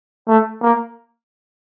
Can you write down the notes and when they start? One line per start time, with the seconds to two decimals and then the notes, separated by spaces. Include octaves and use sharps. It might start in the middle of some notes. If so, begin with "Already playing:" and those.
0.28 A3
0.62 A#3